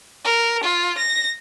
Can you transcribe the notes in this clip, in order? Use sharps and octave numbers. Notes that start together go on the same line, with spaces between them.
A#4
F4
A#6